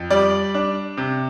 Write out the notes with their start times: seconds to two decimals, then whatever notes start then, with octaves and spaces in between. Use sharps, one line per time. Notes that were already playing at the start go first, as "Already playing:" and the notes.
Already playing: F2
0.10 G3 D5
0.54 D4
0.97 C3